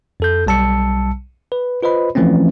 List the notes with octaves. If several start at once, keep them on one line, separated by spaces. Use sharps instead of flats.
F2 A4 G6
B1 G3 A5 E6 C#7
B4
F4 B4 C5 D#5 B5
E3 F3 A3 C4 C#4